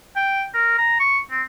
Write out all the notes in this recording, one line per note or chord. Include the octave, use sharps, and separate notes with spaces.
G5
A#4
A#5
C#6
C4